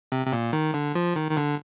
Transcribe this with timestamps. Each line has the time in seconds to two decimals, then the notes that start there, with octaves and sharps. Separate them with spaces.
0.12 C3
0.27 C3
0.33 A#2
0.53 D#3
0.74 D3
0.95 F3
1.16 D#3
1.31 D#3
1.37 D3